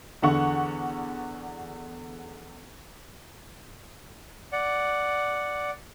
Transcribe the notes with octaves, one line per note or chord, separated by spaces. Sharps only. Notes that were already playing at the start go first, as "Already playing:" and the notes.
E2 D3 F#5 C#6
D5 F#5